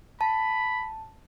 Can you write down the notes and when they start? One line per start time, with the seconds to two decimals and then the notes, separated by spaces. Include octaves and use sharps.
0.21 A5 B5